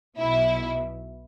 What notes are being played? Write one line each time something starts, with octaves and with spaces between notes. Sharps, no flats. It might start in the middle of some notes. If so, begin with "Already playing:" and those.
B1 B2 E4